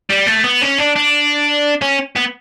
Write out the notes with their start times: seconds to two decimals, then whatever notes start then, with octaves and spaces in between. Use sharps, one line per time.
0.10 G3
0.26 A3
0.44 B3
0.62 C#4
0.78 D4
0.96 D4
1.82 C#4
2.16 B3